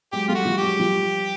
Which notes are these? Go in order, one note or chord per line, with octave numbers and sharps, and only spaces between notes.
F#3 G#3 G4
G3 A3 F4
F#4
F3 G3
G4
F#3 G#3
F3 G3